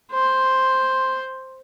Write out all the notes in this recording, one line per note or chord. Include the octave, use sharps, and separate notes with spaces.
C5 C6